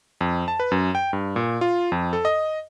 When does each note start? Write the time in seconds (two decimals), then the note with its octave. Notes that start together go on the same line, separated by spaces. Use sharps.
0.21 F2
0.48 A5
0.60 B4
0.72 F#2
0.95 G5
1.13 G2
1.36 A#2
1.61 F4
1.92 F2
2.13 A4
2.25 D#5